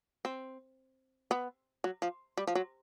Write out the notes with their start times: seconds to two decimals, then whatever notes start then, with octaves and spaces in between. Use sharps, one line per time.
0.25 C4
1.31 B3
1.84 F#3
2.02 F3
2.37 G3
2.47 F3
2.55 F#3